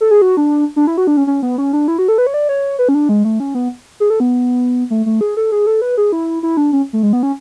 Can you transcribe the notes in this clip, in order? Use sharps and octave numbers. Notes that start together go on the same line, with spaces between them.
A4
G#4
F#4
D4
D4
E4
F#4
D4
C#4
C#4
B3
C#4
D4
E4
F#4
A4
B4
C#5
D5
C#5
B4
C#4
D4
G#3
A3
C#4
B3
G#4
A4
B3
A3
A3
G#4
A4
G#4
A4
B4
G#4
E4
E4
D4
C#4
A3
G#3
B3
C#4